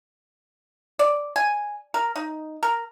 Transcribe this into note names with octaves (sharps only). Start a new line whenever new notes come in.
D5
G#5
A#4
D#4
A#4